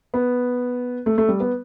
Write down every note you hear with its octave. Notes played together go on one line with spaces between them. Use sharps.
B3
A3
A3
G3
B3